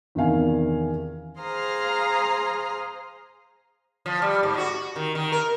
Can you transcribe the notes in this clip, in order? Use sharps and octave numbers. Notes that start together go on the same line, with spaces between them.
E2 C3 D#3 D4 F5 G#5
G#4 C5 F5 A#5 D#6 F6
F3
G3
G#2
F#4
D#3
D#3
A#4